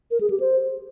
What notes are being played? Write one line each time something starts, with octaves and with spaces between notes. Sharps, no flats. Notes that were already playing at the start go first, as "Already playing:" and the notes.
A#4
G#4
G4
C5